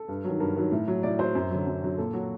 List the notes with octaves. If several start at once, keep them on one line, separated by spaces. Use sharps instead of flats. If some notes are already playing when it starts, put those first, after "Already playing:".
Already playing: A4
G2
D#3 F#3
G2 A#4
D#3 F#3
A2
F#3
A2 D5
F#3 C5
F#2
D3 F#3
F#2
D3 F#3
A#2 A4
F#3 F#4